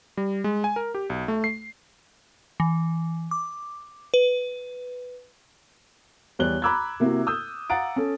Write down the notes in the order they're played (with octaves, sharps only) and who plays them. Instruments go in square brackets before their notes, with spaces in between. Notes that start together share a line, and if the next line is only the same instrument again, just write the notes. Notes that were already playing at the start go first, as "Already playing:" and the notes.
[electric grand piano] G3
G#3
G#5
A#4
G4
B1
A3
C7
[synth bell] E3
D6
B4
[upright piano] E2 G3 C#5 D5 F#6 G7
A#5 B5 D6 E6 F#6 G#6
C3 A#3 E4 F#4
D#6 E6 G6
F5 F#5 A#5 A6 D7
C#4 A4